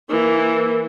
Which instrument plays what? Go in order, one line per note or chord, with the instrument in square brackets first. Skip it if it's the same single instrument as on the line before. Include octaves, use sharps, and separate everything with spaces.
[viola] E3 A#3